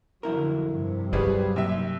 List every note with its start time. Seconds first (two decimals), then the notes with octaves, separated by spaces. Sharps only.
0.23 F2 D3 F#3 E4 A#4
0.70 G2 C3
1.13 C2 F#3 G3 G4 G#4 B4 D5
1.56 D#2 C3 E5